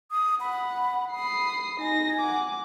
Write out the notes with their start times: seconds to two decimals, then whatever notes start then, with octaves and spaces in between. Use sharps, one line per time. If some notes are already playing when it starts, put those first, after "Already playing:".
0.11 D#6
0.40 F#5 B5
1.14 B5 D#6 C7
1.80 D#4 G#5 A#6
2.20 F#5 D6